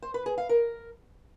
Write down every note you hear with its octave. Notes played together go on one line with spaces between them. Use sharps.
C5
B4
G#4
F5
A#4